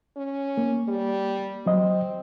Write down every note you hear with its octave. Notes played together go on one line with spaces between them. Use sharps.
C#4
A#3
G3
F#3 C4 D#5